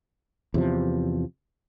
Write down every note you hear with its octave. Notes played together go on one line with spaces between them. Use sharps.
E2 C3 F3